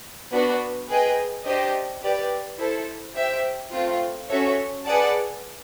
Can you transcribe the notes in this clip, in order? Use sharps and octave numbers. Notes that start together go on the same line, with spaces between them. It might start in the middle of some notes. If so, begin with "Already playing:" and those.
B3 D4 F#4 B4
G#4 B4 D#5 G5
D4 G4 C5 D#5
G4 B4 D5
E4 A4 C5
G4 C5 E5 G5
A3 C4 F4
C#4 F#4 A4 C#5 E5
G#4 B4 D5 F#5 A5